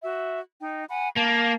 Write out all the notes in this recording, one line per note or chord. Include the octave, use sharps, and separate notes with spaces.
F#4 E5
D#4 D#5 G5
F#5 G#5 B5
A#3 F5 A5